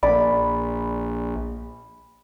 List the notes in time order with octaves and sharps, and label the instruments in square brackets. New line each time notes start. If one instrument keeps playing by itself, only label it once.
[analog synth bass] A#1 [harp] D5 [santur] B5